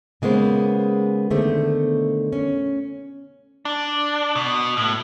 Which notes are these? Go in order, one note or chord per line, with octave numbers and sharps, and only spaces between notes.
C#3 G#3 A#3 B3 C5
B2 D3 D#3 A3 C5
C#4
D4
B2
A2